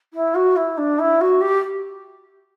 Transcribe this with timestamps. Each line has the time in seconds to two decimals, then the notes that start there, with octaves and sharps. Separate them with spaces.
0.13 E4
0.35 F#4
0.56 E4
0.77 D4
0.99 E4
1.21 F#4
1.41 G4